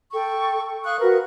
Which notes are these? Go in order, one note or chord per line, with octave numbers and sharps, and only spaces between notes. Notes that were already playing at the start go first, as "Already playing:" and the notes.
A4 G5 C#6
F5 C#6 D#6 F#6
F#4 A#4 B4